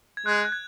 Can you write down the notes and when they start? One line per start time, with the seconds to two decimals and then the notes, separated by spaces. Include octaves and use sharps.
0.17 G#6
0.26 G#3 F#6
0.45 F#6
0.52 G#6